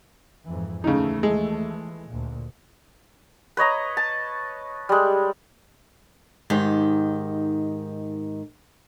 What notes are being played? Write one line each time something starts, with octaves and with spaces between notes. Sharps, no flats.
F2 G#2 E3
D#2 C#3 E3 A3 D#4
G#3
D2 A#2
B4 C#5 D#5 A#5
A5
G3 G#3
G#2 D#3 G4